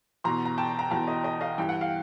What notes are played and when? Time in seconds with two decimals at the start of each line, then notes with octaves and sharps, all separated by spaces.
0.24 E2 B2 A#5 C6
0.45 A#5
0.58 G5 A5
0.79 A#5
0.91 E2 B2 G5 A5
1.07 D#5
1.24 D#5
1.41 D#5 F5
1.58 G2 E3 G5
1.69 F#5
1.81 F5